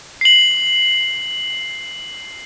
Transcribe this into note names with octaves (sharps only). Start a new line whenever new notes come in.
C7 F#7